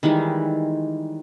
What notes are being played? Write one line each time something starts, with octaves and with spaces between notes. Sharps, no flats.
D#3 E3 G3 G#3